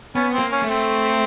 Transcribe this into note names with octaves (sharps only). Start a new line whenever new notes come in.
B3 C#4
C4
A#3
C#4
A3
C4